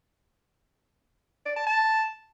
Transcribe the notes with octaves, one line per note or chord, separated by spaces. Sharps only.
D5
A5
A5